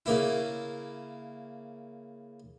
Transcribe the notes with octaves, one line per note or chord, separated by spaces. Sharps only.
C#3 A#3 E4